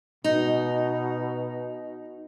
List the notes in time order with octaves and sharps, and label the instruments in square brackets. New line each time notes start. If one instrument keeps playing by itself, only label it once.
[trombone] B2 [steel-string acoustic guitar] D#4